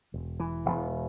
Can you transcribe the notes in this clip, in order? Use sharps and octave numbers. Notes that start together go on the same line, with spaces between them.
E1
E3
E1